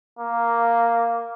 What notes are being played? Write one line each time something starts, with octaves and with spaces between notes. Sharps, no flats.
A#3